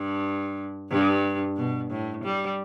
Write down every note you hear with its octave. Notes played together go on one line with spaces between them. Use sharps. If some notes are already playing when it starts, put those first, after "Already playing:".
Already playing: G2
G2
B2
A2
G3